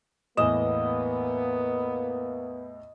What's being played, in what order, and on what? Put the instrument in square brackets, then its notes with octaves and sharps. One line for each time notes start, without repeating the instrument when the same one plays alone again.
[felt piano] E2 A2 E7 [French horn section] A#3 B3 [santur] D#5